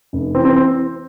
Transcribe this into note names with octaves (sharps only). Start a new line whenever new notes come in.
F1
E3 C4
C4
C4